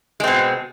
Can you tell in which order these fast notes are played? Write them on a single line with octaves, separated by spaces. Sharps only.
G#3 C4 B2